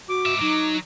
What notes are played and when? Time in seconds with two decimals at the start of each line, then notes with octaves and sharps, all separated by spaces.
0.09 F#4 D6
0.26 G#2 E5
0.41 F#3 D#4